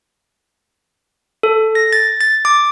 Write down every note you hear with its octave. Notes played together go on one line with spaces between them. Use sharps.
A4
A#6
A6
A6
D6